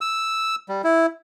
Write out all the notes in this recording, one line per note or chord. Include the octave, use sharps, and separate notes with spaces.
E6
G3
E4